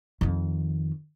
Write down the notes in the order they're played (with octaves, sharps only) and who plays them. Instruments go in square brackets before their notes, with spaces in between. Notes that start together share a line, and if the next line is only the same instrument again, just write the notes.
[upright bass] F2 D#3